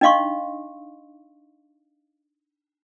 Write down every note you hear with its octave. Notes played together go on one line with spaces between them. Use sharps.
D4 D#4 D#5 F5 C6 C#6